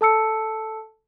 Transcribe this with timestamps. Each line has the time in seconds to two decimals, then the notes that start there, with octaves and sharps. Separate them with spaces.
0.01 A4 A5 E6 C#7